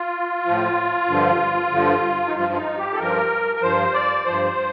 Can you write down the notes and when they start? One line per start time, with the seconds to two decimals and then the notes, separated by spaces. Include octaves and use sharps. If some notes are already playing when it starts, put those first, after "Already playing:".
Already playing: F4
0.45 A2 F3
1.09 G2 D3 F3
1.72 G2 D3 F3
2.27 D#4
2.35 G2 F3 F4
2.52 F4
2.56 D#4
2.78 G4
2.94 A4
2.99 G2 F3 A#4
3.56 A#4
3.62 G2 F3 C5
3.93 D5
4.25 G2 F3 C5